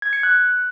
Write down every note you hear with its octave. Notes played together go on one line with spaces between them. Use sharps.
G#6
C#7
F#6